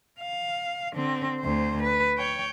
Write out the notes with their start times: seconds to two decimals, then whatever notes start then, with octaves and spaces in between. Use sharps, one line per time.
0.20 F5
0.94 D3 C4
1.40 D2 C5
1.83 B4
2.18 C#5 G5